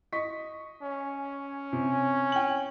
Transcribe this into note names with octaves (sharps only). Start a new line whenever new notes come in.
D#5 C#6 B6
C#4
C3
G5 F#7